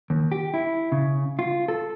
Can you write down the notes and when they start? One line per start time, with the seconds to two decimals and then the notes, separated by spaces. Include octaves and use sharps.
0.10 D#2
0.32 G4
0.54 E4
0.92 C#3
1.39 F4
1.68 A4